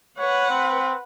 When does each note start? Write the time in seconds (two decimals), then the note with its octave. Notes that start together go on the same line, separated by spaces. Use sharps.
0.19 B4 C#5 F#5
0.50 C4